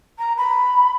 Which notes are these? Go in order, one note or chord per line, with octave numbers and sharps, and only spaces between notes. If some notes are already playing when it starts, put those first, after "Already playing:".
A#5
B5